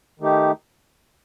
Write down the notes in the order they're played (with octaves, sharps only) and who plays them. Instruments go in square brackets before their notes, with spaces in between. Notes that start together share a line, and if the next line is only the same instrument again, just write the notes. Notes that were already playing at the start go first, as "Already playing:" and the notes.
[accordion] D#3 A3 D#4 G4